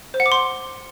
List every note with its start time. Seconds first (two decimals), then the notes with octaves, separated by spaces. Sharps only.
0.14 C5
0.20 F#5
0.26 D6
0.32 C6